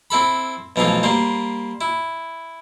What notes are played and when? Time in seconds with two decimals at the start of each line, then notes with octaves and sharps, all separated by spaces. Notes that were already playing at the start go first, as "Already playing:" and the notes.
0.10 C4 E4 A4 B5
0.76 B1 E3 F3 A3 F4
1.03 G3 A#3 C5
1.81 E4